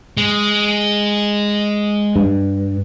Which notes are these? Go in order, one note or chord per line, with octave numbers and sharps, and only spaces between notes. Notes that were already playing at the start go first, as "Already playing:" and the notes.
G#3
G2